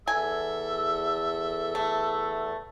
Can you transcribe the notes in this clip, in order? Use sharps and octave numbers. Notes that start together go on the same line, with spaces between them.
E2 A4 E5 G#5
A3